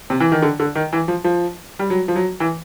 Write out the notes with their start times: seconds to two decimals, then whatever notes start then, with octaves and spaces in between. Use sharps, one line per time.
0.10 C3
0.20 E3
0.32 D#3
0.42 D3
0.59 D3
0.75 D#3
0.93 E3
1.08 F3
1.24 F3
1.79 G3
1.90 F#3
2.08 F3
2.16 F#3
2.40 E3